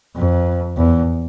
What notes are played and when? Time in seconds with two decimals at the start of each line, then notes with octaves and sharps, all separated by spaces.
0.15 F2
0.78 E2